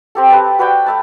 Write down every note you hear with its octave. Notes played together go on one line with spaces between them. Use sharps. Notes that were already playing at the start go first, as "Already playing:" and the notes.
C4 G4 A4
G4 B4 A5
F#4 B4 D5 G5
A3 E5 A5